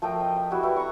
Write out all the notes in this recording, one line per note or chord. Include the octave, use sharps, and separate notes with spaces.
F3 A3 A#4 G5
D#5
E5
G3 E4 F#4
E4 F#4 B4
A#5 C#6